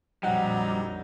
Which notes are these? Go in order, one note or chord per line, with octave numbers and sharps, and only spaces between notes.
A#1 F2 F#3 G3 C4 D#4 F#5